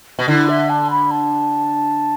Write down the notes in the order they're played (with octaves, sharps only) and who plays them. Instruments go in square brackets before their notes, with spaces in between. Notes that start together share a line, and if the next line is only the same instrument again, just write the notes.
[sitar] B2
[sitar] D3 [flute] E4
[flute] E5
A5
B5
A5